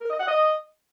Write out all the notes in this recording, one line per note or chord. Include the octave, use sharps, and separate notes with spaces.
A#4
D#5
F#5
D#5